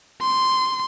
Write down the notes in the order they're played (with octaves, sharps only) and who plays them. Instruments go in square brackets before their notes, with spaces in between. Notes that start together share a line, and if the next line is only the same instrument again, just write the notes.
[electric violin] C6